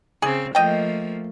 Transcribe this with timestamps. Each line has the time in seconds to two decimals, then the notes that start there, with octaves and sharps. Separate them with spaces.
0.22 C#3 C4 G#4
0.55 F3 A3 A#3 D#5 G5